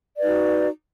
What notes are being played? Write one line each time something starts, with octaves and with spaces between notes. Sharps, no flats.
D#4 F#4 B4 D5